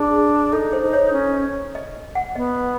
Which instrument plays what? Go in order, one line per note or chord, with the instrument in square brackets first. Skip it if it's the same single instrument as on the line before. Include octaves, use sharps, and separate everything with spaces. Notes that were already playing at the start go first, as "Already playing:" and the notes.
Already playing: [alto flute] D4 [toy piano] G#4
[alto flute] D#4 [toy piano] A4
[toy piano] C5
[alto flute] D#4
[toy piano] C#5
[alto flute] C#4
[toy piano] D#5
F#5
[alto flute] B3 [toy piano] D#5